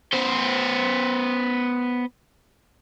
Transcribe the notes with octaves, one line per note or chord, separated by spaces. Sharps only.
B3 C5